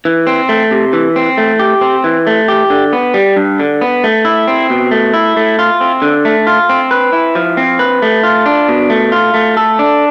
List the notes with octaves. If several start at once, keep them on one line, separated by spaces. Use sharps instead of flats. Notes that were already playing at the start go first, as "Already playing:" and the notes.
E3
C4
A3
C3
E3
C4
A3
G4
C4
E3
A3
G4
D3
B3
G3
G2
D3
B3
A3
E4
C4
B2
A3
E4
A3
F4
C4
D3
A3
F4
C4
B4
E4
F3
C4
B4
A3
F4
D4
B2
A3
F4
A3
A4
D4